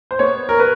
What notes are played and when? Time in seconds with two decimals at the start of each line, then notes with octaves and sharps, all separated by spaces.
0.11 C5
0.19 B3 C#5
0.49 A#4
0.59 B4